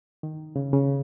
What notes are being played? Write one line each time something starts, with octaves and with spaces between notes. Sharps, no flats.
D#3
C#3
C#3